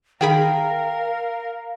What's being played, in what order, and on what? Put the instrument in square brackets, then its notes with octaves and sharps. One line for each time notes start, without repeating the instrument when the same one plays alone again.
[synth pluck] D#3 G#4 B5 [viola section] A#4 [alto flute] F5 [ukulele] G5